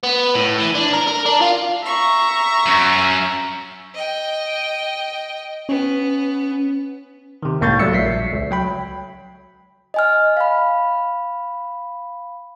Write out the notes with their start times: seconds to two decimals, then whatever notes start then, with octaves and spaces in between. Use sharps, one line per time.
0.03 B3
0.35 A2
0.58 E3
0.75 D4
0.93 A#4
1.07 A#4
1.25 D4
1.41 F4
1.85 E5 A#5 C#6
2.66 F#2
3.94 D#5 G5
5.69 B3 C#4
7.43 C3 D#3
7.61 C#2 A2 A#3 C#6 G6 A6
7.79 F#3 G3 A3 D5 E6 C#7
7.92 A#1 E5 B6 C7
8.33 C#2
8.51 F#3 G5 B5
9.94 D#5 G#5 F6
10.37 F5 B5